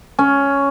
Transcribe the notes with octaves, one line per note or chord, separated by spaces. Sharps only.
C#4